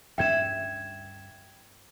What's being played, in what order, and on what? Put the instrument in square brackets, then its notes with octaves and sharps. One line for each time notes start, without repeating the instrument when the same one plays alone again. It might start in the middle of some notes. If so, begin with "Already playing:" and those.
[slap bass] D2 G2 C#4 [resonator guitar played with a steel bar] E5 [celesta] G5 G#6 E7